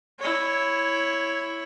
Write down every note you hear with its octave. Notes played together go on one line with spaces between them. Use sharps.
E4 C#5